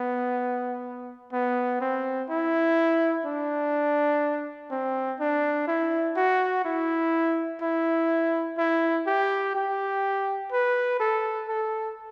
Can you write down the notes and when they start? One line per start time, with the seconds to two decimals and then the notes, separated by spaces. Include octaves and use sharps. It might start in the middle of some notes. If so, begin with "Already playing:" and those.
Already playing: B3
1.32 B3
1.81 C4
2.29 E4
3.25 D4
4.71 C4
5.20 D4
5.68 E4
6.16 F#4
6.65 E4
7.62 E4
8.58 E4
9.06 G4
9.55 G4
10.52 B4
11.00 A4
11.49 A4